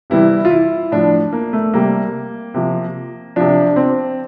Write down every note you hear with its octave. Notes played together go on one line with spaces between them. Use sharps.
C3 E3 G3 E4
F4
E4
A2 F3 D4
A#3
A3
C3 G3 A#3
C3 F3
C3 F3 D4
C4